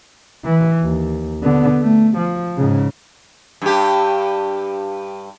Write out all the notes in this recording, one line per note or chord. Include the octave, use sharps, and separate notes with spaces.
E3
D#2
D3 B3
A3
F3
G#2 C#3
G2 G4